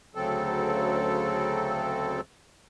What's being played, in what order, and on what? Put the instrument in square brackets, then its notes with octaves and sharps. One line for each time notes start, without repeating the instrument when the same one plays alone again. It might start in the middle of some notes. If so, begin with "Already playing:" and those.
[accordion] D2 C#3 F#3 C4 A4